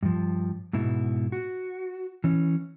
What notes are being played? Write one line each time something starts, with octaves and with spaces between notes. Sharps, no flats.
G2 F3
G#2 B2 E4
F#4
E3 C#4